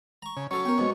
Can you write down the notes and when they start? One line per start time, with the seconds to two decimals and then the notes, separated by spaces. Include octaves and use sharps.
0.22 A#5 C#6
0.37 C#3
0.51 F#3 C#4 A4 C#5 F5
0.65 B3 A#4 G5
0.78 B1 G#2 B2